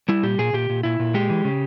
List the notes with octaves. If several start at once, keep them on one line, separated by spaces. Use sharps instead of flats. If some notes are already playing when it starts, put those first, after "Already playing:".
G3 E4
A#2 G4
A#2 G#4
A#2 G4
A#2
A#2 E4
A#2
G#3 G4
E3
C#3